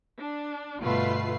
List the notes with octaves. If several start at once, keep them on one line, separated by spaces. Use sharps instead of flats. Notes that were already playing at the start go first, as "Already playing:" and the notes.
D4
G1 B2 A3 F4 B4 C7